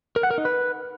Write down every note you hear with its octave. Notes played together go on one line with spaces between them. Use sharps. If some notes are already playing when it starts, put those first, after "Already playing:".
A#4
F#5
A#4
D#4
B4